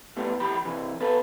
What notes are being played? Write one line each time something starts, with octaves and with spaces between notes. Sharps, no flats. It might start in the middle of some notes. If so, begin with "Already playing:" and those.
A2 G3 B3
D2 E3 G4 B5
C3 E3
B3 A4 B4